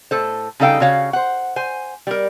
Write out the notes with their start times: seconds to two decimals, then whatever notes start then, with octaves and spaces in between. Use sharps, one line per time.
0.11 A2 A4 C5
0.60 C#3 G3 D#4 A4 F5 G5
0.80 C#3 F#4 C#5 F5
1.13 C5 F#5
1.56 C5 G#5
2.07 G3 A#4